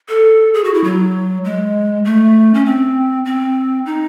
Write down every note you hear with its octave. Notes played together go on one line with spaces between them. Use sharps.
A4
G#4
F#4
E4
F#3
G#3
A3
C#4
C4
C4
D#4